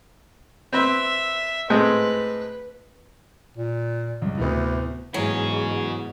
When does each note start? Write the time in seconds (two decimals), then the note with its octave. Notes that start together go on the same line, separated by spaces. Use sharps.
0.73 C4 B4 E5
1.70 A2 G#3 C4 B4
3.57 A#2
4.22 C#2 G2
4.38 D2 A2 C3 B3
5.14 E2 G#2 F#3 G#4 C#5